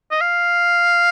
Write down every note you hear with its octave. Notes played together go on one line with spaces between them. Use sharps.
D#5
F5